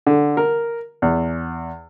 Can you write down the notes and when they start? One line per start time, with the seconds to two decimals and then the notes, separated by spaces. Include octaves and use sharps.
0.07 D3
0.37 A#4
1.02 E2